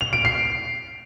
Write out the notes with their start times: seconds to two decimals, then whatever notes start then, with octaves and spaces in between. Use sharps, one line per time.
0.01 F7
0.13 D7
0.25 C7